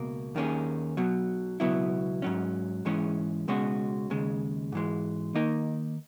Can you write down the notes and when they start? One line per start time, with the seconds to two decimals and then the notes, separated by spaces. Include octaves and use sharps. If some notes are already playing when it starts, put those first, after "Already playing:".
Already playing: C#2 B2 A#3
0.35 D#2 D#3 A#3 C#4 G#4
0.97 B1 B2 F#3
1.60 C#2 B2 F#3 B3 E4
2.22 G#2 F#3 C#4
2.85 G#2 E3 G#3 C#4 G#4
3.48 C#2 B2 G#3 C#4 F#4
4.10 D#2 C#3 G#3
4.72 G#2 E3 G#3
5.34 D#3 A#3 D#4 A#4 D#5